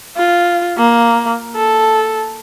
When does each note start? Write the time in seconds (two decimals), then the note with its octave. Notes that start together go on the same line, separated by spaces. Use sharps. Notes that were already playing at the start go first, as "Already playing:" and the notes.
0.17 F4
0.78 A#3
1.56 A4